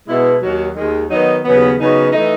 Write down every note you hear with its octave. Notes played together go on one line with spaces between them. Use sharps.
B2 G#3 B3 E4
D#2 D#3 F#3
D#2 D#3 G#3
D#3 F#3 B3 D#4
D#2 C#3 F#3 B3
C#3 F#3 B3 D#4 F#4
E3 A3 D#4